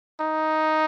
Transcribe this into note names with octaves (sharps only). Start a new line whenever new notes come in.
D#4